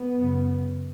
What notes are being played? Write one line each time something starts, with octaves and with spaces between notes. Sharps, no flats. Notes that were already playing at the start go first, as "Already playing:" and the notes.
Already playing: B3
F#2 C#3